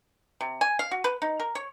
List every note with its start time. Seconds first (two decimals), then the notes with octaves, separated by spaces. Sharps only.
0.41 C3
0.61 G#5
0.79 F5
0.91 F#4
1.04 B4
1.22 D#4
1.40 A#4
1.55 C#5